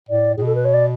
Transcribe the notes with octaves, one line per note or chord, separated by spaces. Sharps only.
A2 D5
A2 G#4
B2 A4
B4
C#5
D5